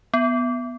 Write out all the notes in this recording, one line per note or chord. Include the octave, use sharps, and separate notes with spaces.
B3